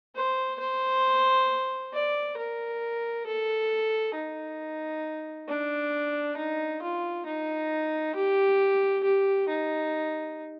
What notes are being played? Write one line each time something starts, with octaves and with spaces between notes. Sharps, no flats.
C5
C5
D5
A#4
A4
D#4
D4
D#4
F4
D#4
G4
G4
D#4